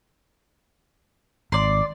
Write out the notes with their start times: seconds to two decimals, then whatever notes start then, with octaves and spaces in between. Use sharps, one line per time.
1.52 G#1 D5 C6